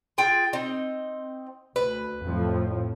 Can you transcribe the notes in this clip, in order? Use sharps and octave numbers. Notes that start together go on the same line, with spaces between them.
F4 G#4 G5
C4 D#4
D2 B4
F2 A2 F3